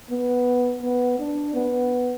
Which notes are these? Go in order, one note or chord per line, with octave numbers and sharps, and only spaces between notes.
B3
B3
D4
B3